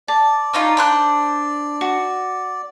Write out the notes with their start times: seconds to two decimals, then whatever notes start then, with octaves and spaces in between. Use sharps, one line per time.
0.08 D5 A5
0.53 C#4 D#4 F4
0.77 D4 C5 F#6
1.81 F#4